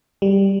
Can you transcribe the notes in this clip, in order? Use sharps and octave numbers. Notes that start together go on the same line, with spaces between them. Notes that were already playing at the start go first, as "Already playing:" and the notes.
G3